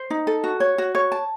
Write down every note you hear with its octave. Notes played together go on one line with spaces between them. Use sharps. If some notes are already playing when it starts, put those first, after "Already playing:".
Already playing: C5
D#4
A4
F#4
C#5
F#4
C#5
A5